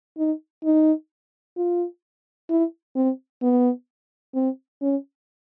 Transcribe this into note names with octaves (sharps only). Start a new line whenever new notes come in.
D#4
D#4
F4
E4
C4
B3
C4
C#4